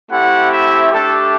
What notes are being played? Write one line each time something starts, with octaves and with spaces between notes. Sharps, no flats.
A3 C4 E4 G4 F#5
E5
A3 D4 G4 A4